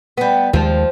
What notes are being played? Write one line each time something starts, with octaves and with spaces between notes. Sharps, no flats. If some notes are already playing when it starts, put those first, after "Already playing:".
G3 B3
D#2 F3 G#3